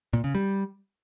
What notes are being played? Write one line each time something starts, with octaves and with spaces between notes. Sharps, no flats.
A#2
C#3
G3